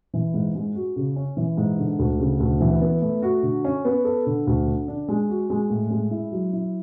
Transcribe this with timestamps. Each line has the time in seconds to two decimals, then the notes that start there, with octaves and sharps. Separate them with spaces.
0.14 E3
0.34 G#2
0.55 G#3
0.75 F#4
0.96 C#3
1.16 C#4
1.37 E3
1.57 G#2
1.79 D3
1.99 D2
2.20 C#3
2.40 D2
2.60 E3
2.82 B3
3.02 A3
3.22 F#4
3.43 D3
3.64 C#4
3.85 B3
4.05 A4
4.26 D3
4.47 D2
4.67 D3
4.88 D4
5.08 G#3
5.29 F#4
5.50 G#3
5.70 A2
5.91 G#3
6.11 E4
6.32 F#3
6.53 E4